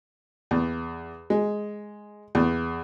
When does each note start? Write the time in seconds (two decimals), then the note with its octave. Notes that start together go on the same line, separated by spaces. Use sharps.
0.51 E2
1.30 G#3
2.35 E2